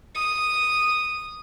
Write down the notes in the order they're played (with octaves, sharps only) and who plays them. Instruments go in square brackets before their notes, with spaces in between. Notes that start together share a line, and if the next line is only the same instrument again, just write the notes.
[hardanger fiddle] D#6